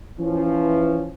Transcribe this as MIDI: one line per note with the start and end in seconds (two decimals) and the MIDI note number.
0.19 1.10 52
0.19 1.10 53
0.19 1.10 61